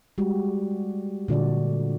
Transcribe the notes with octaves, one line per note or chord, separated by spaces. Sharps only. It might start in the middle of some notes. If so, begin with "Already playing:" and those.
G3 G#3 F#4 G4
A#2 D3 F#4 D5